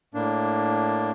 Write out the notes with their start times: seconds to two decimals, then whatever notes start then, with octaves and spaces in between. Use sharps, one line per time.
0.14 A2 A#3 D4